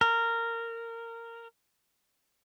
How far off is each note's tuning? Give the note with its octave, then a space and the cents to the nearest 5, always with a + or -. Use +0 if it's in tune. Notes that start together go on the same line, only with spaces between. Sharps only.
A#4 -15